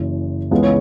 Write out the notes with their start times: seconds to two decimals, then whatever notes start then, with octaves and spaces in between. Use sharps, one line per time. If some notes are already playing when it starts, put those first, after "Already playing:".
Already playing: F#1 F#2 E3
0.51 C#2 C#3 E3 G#3 B3
0.63 C#5